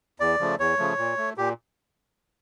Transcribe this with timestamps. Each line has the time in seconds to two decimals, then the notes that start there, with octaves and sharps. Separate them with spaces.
0.20 E2 D5
0.40 C#3 F3 A3
0.59 E2 C#5
0.78 C#3 F3 A3
0.98 A#2
1.18 A3
1.38 A#2 G4